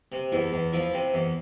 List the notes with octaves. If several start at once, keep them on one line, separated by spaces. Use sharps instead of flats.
C3
E2 E4
E2
F3 E4
C3
E2